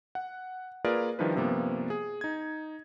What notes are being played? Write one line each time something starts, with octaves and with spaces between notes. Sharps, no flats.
F#5
A#3 F4 G#4 A#4 B4 D5
D#3 F3 G3 D4 E4 B4
G2 C3 F3 A#3 B3
G#4
D#4 G#6